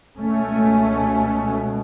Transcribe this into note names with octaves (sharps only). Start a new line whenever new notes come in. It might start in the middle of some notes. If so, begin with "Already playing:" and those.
C#2 B2 A3 C#4